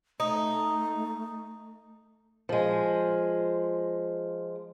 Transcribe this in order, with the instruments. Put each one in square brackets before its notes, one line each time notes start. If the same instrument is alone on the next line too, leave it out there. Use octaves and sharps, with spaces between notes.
[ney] A3 [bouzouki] D#4
[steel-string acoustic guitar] F3 G#3